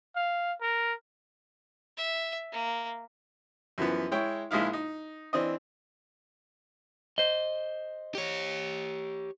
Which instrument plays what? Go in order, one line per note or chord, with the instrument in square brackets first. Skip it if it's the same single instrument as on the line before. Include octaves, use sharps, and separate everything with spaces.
[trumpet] F5
A#4
[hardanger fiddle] E5
A#3
[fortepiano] F#2 E3 F3 B3
G#3 E4 C#5 G5
A#1 G#3 D#4 E4 F5
D#4
E3 C4 D4 D#5
[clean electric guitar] C5 D#5
[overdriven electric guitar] G4 C#5